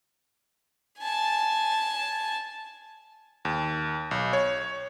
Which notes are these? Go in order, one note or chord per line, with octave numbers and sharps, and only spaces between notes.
G#5 A5
D#2
B1
C#5